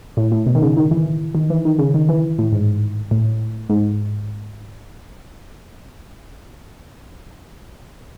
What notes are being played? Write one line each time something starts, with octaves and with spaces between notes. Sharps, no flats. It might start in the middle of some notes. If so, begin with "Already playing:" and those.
A2
A2
B2
D#3
C#3
D#3
E3
D#3
E3
D#3
C#3
D#3
E3
A2
G#2
A2
G#2